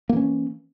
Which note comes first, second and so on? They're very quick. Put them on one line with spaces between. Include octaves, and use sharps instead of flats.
A#3 E3 C#4